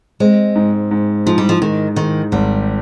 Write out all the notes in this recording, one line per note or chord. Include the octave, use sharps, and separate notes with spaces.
G#3 C4
G#2
G#2
G#2 F3
G3
F3
G#2 D#3
G#2 D#3
G#1 G3